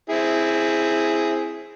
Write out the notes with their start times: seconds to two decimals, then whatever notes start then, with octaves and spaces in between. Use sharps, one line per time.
0.10 C4 E4 G#4